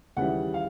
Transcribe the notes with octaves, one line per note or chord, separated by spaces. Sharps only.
D#2 C#3 E3 G3 F#5
F5